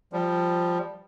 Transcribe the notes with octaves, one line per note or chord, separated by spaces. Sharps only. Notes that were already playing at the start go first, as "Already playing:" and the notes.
F3 G3